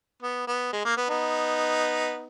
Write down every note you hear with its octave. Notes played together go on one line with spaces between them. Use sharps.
B3
B3
G#3
A#3
B3
B3 D#4